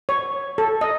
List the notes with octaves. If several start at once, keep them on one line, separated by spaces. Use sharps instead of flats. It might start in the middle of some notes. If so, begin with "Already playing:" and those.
C#5
A4
D#5